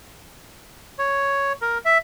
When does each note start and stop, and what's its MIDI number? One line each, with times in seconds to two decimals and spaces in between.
0.99 1.53 73
1.62 1.78 70
1.85 1.98 76